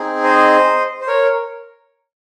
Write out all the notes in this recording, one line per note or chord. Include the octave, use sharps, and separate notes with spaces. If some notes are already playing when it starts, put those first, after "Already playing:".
Already playing: C4 D#4 G#4
C5 D#5
C5
A#4 C#5